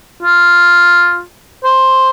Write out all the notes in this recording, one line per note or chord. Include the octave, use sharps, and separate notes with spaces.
F4
C5